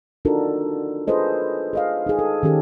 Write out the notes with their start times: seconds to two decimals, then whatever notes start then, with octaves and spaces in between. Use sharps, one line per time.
0.25 D4 D#4 F4 F#4 A4 A#4
1.08 F4 G#4 A4 B4 C5 D#5
1.73 G#4 D#5 F5
2.06 D#4 G#4
2.19 A4
2.43 D#3 C#4 G4 A4